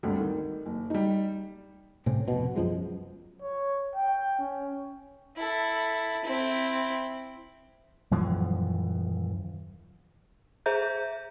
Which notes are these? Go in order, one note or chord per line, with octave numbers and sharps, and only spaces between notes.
G#1 D2 G3
D#3
F#1
G3 D#4
A2 C3 C4 C#4
F1 B2
F#2 F3 G#3
C#5
G5
C#4
E4 A4
C4 E4
D#1 F#2 E3 F3
G#4 C5 E5 A#5 G6